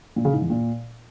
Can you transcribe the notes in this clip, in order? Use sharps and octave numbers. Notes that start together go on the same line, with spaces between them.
A#2
C#3
G#2
E2
A#2